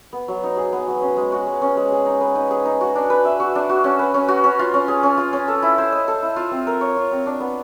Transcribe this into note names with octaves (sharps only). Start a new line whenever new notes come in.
B3
F#3
D#4
G#4
B3
F#3
C#4
G#3
F#4
G#3
C#4
G#3
G#4
D#4
B4
D#4
G#4
D#4
F#4
D4
B4
E5
F#4
D4
F#4
C#4
B4
C#4
F#4
C#4
F4
C#4
G#4
C#4
F4
C#4
A4
E4
C5
D#5
A4
E4
F4
C4
A#4
C#5
F4
C4
D4
B3